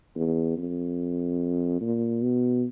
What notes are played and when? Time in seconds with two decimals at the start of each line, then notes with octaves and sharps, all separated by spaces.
0.16 E2
0.58 F2
1.81 A#2
2.22 B2